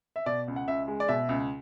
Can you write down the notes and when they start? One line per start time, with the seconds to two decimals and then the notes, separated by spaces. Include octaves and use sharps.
0.16 E5
0.26 B2 D5
0.48 C#2
0.56 F#5
0.68 C#2 E5
0.88 G#3
1.00 D5
1.08 B2 E5
1.29 C#2